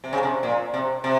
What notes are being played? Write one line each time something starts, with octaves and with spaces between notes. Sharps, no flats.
C3
C#3
C3
A#2
C3
C3